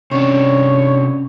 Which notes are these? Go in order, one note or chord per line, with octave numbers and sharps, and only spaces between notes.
C3 C#4 D4 C#5